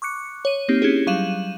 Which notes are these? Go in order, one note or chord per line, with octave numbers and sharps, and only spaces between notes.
C#6 D6 F#6 C#7
C#5 D#7
A#3 C4 D#4 G4
C#4 E4 G4 G#4
F#3 G3 F5 D#7 E7 F#7